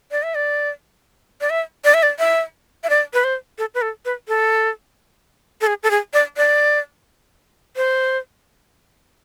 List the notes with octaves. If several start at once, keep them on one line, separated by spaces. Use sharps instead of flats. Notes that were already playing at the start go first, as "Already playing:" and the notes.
D5
E5
D5
D5
E5
D5
E5
D5
E5
E5
D5
B4
C5
A4
B4
A4
B4
A4
A4
G#4
A4
G#4
D5
D5
C5